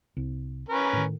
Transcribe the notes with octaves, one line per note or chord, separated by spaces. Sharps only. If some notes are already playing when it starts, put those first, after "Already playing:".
C2
C#4 A#4 B4
A2 D#3